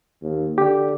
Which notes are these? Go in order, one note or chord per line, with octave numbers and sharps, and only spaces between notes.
D#2
D3 G4